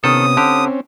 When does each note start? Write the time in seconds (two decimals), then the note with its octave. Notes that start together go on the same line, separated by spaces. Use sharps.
0.04 C3 D#3 B3 C#4 A4 D#6
0.37 D3 C4 C#4 G4